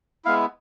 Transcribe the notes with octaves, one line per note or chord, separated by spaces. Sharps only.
G#3 B3 E4 F5